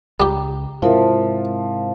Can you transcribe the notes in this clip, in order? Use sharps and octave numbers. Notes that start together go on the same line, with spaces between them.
C#2 G3 G4 G5 A#5
G#2 C3 F3 E4 A#4 E5